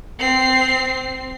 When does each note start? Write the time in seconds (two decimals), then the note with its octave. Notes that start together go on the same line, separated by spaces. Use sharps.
0.19 C4 C7